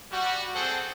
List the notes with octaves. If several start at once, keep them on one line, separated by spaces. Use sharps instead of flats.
G3 F#4
C4 G#4 A4 C5 F#5 G5